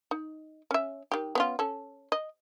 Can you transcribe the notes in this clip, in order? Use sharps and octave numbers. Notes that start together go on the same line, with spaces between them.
D#4
C#4 E5
D#3 G4
B3 C#4 F4
C#4 A4
D#5